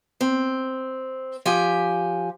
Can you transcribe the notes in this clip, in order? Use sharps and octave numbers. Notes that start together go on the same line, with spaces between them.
C4
F3 G4 G#5